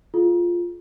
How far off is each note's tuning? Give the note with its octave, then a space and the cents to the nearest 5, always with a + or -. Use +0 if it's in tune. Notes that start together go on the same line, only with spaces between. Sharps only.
F4 +0 G#4 +45